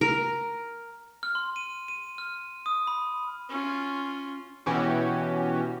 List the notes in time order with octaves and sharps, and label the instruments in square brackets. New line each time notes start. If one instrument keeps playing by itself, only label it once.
[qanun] A#4
[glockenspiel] F6
C6
D#7
D#7
F6
D#6
B5
[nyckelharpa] C#4 F4
[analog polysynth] B2 E3 C#4 F#4 G4